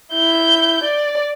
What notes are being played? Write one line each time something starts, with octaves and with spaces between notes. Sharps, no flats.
E4 G6
D5